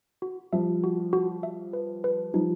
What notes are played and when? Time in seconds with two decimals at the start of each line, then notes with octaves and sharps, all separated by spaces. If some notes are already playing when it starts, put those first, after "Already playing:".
0.22 F#4
0.53 F3 G3 E5
0.84 F#4
1.13 F#4
1.43 E5
1.73 B4
2.04 B4
2.34 F3 G3 D#4